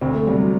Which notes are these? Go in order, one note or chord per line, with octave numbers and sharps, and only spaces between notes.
D2 C4
A3
C3 F#3 G3
F#3